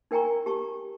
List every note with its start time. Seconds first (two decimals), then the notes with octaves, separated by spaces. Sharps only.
0.11 D#4 A#4 G5 G#5 A#5 C#6
0.46 G4 A5 C#6